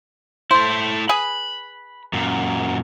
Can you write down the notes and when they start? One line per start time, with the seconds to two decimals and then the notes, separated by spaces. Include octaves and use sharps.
0.51 A3 E4 C5
1.09 G#4 B4 B5
2.13 F#2 A#2